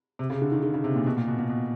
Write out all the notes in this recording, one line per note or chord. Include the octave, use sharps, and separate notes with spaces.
C3
C#3
D3
D#3
D3
C#3
C3
A#2
B2
A#2
B2
A#2
B2